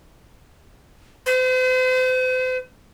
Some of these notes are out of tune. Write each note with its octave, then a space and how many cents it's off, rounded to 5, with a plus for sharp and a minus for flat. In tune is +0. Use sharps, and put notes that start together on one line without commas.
C5 -40